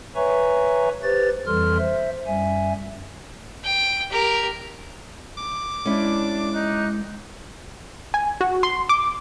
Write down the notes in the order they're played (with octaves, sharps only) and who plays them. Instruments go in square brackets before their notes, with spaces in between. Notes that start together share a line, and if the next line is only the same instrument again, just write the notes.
[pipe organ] B4 C#5 E5 G#5 A#5 C#6
G4 B4 C5 A6
F2 E3 G3 A4 C6 F6
C5 E5
F#2 G3 E5 G#5
[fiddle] G5
G4 A#4
[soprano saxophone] D6
[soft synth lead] G#3 [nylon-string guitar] C#4 E4 [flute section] D4
[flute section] D#4 F#6
[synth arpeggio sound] G#5
F#4
C6
D6